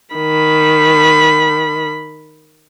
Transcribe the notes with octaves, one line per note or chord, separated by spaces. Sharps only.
D#3 B5